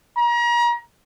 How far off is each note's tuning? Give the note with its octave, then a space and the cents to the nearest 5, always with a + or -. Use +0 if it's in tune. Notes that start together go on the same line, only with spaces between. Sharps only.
A#5 +35